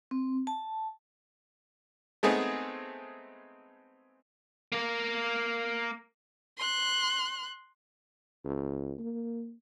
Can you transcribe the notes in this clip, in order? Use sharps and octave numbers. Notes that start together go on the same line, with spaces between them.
C4
A5
G#3 A3 B3 C4 D#4 G#4
A#3 A#4
C6 F#6
C#2
A#3